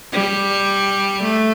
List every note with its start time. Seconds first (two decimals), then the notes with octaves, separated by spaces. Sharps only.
0.13 G3
1.24 A3